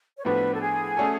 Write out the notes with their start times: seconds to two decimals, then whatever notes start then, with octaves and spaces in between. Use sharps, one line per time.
0.18 C#5
0.25 A2 F3 B3 D4 F#4 B4
0.54 A4
0.61 G#4
0.97 A3 C#4 F#4 A4